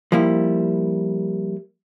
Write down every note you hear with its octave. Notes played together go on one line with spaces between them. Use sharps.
F3 G3 A#3 E4